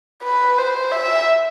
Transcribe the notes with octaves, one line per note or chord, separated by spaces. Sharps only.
B4
C5
E5